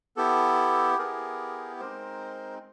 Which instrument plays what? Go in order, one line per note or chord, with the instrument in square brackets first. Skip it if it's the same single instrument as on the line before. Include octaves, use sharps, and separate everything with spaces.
[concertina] B3 E4 G4 A4
B3 E4 G4 G#4 A#4
G#3 C4 D#4 A#4 C5